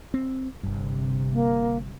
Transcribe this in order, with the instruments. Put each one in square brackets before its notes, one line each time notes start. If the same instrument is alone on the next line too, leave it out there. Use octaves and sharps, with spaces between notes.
[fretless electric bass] C4
[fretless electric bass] G1 G2 [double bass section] C3
[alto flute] A#3